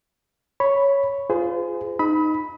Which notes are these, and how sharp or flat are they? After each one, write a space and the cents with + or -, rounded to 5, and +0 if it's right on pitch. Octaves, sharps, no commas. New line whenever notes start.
C#5 +0 B5 +0
F4 +0 G#4 +0 C5 -40
D#4 -5 B5 +0 D#6 +40